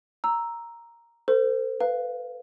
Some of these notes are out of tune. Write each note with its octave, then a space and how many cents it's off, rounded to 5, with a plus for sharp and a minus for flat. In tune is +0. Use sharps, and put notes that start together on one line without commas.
A#5 +0 E6 +0
A4 +45 C5 -20
B4 +15 F5 +0